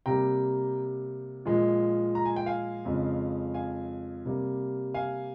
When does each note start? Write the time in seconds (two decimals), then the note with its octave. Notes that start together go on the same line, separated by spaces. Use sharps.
0.06 C3 G3 A#3 G5 A#5
1.45 A#2 F3 G#3
2.15 A#5
2.25 G#5
2.36 G5
2.46 F5 G#5
2.85 F2 C#3 G#3
3.54 F5 G#5
4.25 C3 G3 A#3
4.94 F5 G#5